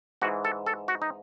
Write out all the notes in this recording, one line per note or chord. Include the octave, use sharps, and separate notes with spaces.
G#2 E3 F#4
A4
A4
F#4
D#4